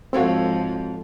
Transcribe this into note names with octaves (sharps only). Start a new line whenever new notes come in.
G#2 F3 C4 F#4 A4 C#5 F5